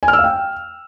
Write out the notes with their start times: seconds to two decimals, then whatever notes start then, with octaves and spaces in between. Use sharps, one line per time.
0.03 G#5
0.08 F6
0.13 E6
0.19 F5
0.24 G5